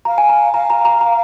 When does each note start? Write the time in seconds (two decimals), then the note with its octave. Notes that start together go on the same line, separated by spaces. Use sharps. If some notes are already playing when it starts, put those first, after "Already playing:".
0.05 F5 A#5
0.18 G#5
0.29 A#5
0.53 F5 A#5
0.70 A#5
0.85 A#5
1.01 A#5